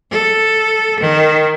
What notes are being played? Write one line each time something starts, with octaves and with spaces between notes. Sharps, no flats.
A4
D#3